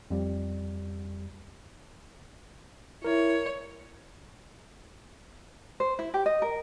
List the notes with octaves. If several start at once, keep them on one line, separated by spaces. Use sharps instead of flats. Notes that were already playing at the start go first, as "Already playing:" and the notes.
F2 G3
E4 A#4 C#5
C5
E4
G4
D#5
A#4